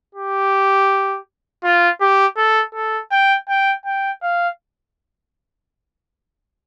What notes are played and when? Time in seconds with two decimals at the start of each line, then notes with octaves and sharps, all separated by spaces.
0.15 G4
1.64 F4
2.01 G4
2.37 A4
2.74 A4
3.11 G5
3.49 G5
3.85 G5
4.22 F5